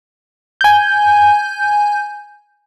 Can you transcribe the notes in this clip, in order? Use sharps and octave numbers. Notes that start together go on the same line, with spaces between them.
G#5 G6